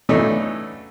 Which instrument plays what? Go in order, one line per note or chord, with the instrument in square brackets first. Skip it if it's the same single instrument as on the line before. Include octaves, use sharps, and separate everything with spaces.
[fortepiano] C#3 E3 F#3 A3 D4 D#4